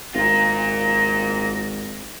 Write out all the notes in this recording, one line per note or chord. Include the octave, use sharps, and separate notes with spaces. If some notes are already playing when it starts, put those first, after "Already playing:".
G#1 F4 A#4 A#6